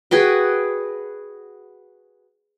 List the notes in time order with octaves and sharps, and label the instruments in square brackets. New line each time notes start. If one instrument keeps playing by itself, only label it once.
[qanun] F#4 G#4 B4 G5